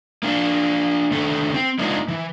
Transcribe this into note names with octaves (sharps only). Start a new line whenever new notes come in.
A#3 D4
D#3 A3 D4 A4
C4
G#3 A#3 D4 D#4 F4
E3